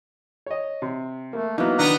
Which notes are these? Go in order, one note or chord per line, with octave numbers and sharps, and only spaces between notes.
C#5 D#5
C3
A3 A#3
F#3 A#3 B3 D#4 E4
D#3 B3 D4 D#4 A#5